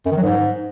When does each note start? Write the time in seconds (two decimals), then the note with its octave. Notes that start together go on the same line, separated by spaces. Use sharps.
0.06 F#2
0.12 D#3
0.17 F#3
0.23 G#2